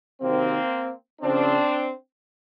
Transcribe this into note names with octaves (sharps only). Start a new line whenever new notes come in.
C3 D#3 F#3 A#3 C4
C#3 F3 C4 D4